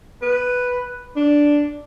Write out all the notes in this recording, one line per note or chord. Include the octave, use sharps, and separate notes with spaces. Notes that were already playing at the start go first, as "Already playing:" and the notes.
B4
D4